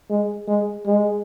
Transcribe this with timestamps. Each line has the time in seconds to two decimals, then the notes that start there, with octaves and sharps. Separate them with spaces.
0.10 G#3
0.47 G#3
0.86 G#3